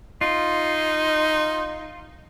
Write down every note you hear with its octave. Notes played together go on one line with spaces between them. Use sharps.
D#4 F4